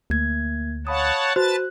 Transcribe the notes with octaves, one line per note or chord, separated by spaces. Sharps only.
D2 A#3 G#6
C#5 F5 F#5 A5 B5 D#6
F#4 B4 C5 A5 F#6 A6